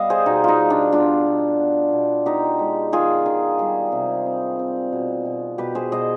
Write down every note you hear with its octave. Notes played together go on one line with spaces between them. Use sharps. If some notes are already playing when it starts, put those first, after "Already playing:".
Already playing: G3 B3 D#5 F5
G#4 C5
B2 D#4
D#4 F4
G3
D4 F4
B3 D4 F4
B2
B3
B2
B3 D#4 G4
G#3
D#3 F4 G#4
D#3
G3
C3
C4
C4
B2
B2
B2 G4 B4
G#4 C5
B2 C5 D#5